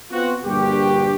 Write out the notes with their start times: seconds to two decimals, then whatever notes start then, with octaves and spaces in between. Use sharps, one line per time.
0.12 B3 C4 F4 F#4
0.43 A#1 G2 D3 A#3 F#4 G4